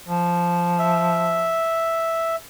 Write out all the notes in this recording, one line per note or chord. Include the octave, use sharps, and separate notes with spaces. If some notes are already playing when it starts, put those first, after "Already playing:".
F3
E5